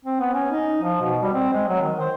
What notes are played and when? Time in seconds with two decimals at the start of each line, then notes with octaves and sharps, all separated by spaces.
0.05 C4
0.20 B3
0.34 C#4
0.52 D#4
0.82 F3
1.01 B2
1.22 G3
1.33 C4
1.53 G#3
1.68 F#3
1.82 D#3
2.00 C5